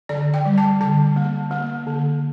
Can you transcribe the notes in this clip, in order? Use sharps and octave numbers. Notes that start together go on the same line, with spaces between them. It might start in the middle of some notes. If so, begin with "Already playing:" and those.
D3 D5
G5
G3
A5
D3 A5
A#3
A#3
D3